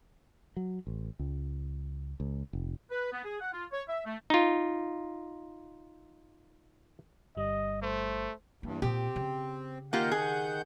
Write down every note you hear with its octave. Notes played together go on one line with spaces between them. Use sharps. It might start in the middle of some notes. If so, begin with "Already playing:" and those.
F#3
A1
C#2
C#2
F1
B4
B3
G#4
F#5
F4
C#5
E5
A3
D#4 F4
G1 G3 D#5
A3 C5
E2 G2 A#3
A#2 C4 G4
C#3
D#3 A#3 F4 G4 F#5 G6
G#4